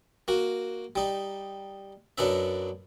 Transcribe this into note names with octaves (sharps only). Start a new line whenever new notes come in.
A#3 F#4
G3 D#4
F#2 F#3 B3 D4 E5